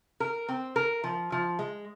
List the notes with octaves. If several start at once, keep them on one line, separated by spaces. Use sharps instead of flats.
A#4
C4
A#4
F3
F3
G#3